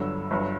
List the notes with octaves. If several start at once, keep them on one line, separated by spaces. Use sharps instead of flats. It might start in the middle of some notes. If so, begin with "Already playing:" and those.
Already playing: G1 G2 D3 F#3 E6
G1 G2 F#3